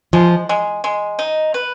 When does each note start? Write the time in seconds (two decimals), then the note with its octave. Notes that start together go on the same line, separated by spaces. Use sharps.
0.13 F3 G#3
0.49 G#3
0.84 G#3
1.19 D#4
1.54 B4